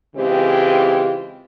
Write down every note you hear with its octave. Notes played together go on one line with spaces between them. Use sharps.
C#3 E3 G#3 C4 F4 G4